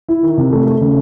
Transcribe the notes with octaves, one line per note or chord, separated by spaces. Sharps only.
E4
D#3
C3
A3
A3
C#3